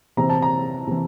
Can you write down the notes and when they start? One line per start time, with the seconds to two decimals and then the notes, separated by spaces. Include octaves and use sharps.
0.17 C3 E3 A#5
0.29 A5
0.42 A#5
0.87 C3 E3